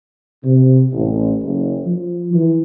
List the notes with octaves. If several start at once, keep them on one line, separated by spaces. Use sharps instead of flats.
C3
A1
F#1
F3
E3